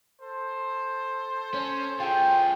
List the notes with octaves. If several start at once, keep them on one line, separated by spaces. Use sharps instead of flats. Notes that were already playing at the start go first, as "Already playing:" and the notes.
A4 C5
C#4
F4 G#4 G5